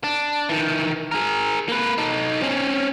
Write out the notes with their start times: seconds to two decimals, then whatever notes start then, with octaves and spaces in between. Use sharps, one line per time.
0.04 D4
0.49 D#3 E3
1.12 G#4 A#4
1.69 A#3 B4
1.98 D#4 A4
2.42 C4 C#4